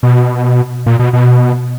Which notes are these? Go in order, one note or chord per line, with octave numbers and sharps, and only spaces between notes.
B2
A#2
B2
B2